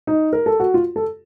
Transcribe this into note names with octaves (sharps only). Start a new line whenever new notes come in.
D#4
A#4
A4
F#4
F4
A4